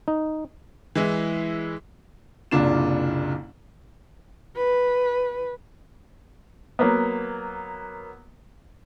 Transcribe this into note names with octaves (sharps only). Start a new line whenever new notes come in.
D#4
E3 G#3 E4
F#1 C2 A#2 D4 F4 E7
B4
F#3 A#3 B3